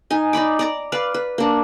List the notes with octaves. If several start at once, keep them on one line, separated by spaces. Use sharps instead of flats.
D#4 G#5
D#4 D5 B5 D6
D5 A#5 D6
B4 D5 F5
B4
A#3 D4